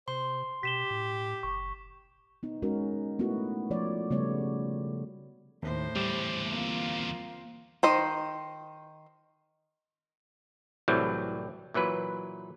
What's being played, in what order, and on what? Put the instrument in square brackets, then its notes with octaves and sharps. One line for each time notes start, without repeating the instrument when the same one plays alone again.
[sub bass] C3 [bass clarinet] C5 [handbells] C6
[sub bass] B2 [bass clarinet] G4 [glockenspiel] B6 E7 G7
[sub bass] A2
[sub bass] F#1 [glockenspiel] C#6
[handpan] B3 D#4
G#3 C#4 D#4 F#4 A#4
A3 B3 D#4 E4 F#4
F3 A3 C#5 D5
C#3 G3 A3 B3 C#5 D5
[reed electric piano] D#2 [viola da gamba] A2 C5
[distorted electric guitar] E2 D3 [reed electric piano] G3 D6
[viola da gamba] A#3 C4 F4
[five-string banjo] D#3 C5 D#5
[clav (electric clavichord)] C2 A2 E3 F#3 G3 C4
A#2 E3 F#3 B4